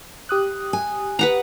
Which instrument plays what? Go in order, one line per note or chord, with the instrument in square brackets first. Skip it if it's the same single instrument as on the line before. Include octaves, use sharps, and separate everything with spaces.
[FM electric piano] G4 D#6 F#6
[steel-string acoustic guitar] G#5
[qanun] B4 F#5 A#5